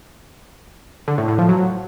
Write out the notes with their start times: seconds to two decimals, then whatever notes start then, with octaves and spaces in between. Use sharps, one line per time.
1.08 D3
1.18 A2
1.28 A2
1.39 F3
1.49 F#3